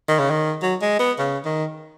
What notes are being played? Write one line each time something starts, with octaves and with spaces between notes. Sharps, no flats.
D#3
C#3
D#3
F#3
G#3
B3
C#3
D#3